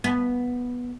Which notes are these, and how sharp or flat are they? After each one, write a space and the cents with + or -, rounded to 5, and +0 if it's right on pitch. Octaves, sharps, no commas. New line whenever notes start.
B3 -10